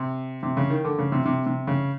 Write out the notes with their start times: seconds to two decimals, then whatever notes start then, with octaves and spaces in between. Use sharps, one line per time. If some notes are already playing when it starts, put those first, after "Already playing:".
Already playing: C3
0.43 C3
0.57 C#3
0.70 D#3
0.85 D3
0.99 C#3
1.12 C3
1.25 C3
1.46 C3
1.67 C#3